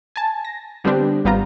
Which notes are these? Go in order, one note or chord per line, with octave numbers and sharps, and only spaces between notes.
G#5 A5
A#6
D3 G3 B3 C4 D4 G4
G#1 G3 B3 F4 A#5